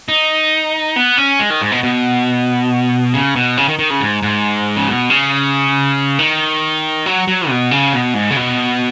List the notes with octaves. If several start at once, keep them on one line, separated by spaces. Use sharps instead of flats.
D#4
B3
C#4
G#3
D#3
G#2
B2
B2
C#3
B2
C#3
D#3
D#3
C#3
G#2
G#2
C#3
B2
C#3
D#3
F#3
F#3
B2
C#3
B2
G#2
C#3
B2